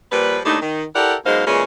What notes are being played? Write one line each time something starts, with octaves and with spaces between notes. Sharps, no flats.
A#2 F3 G3 B4
D#2 A2 A3 D4 D#4
D#3
E4 G4 A4 A#4 D5 F#5
F#2 B2 G#3 D#4 C5 F5
A#2 C#3 E3 G#3 C#4